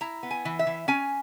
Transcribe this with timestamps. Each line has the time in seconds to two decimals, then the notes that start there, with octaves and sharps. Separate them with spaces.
0.01 E4 A#5
0.23 B3
0.31 G#5
0.45 E3
0.59 E5
0.67 E3
0.88 C#4 G#5